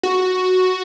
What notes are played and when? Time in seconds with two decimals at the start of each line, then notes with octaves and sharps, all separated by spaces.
0.03 F#4